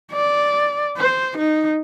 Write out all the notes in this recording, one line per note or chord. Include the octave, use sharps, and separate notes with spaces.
D5
C5
D#4